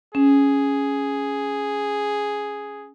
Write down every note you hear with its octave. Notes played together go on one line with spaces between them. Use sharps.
C#4 G#4